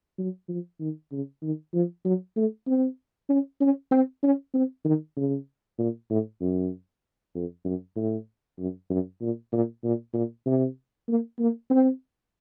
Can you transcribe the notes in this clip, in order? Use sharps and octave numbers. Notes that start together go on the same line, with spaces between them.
F#3
F3
D#3
C#3
D#3
F3
F#3
A3
C4
C#4
C#4
C4
C#4
C4
D#3
C#3
A#2
A2
F#2
F2
F#2
A2
F#2
F#2
A#2
A#2
A#2
A#2
C3
A#3
A#3
C4